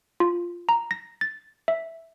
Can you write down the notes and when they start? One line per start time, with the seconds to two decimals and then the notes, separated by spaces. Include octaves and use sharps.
0.20 F4
0.69 A#5
0.91 A#6
1.21 A6
1.68 E5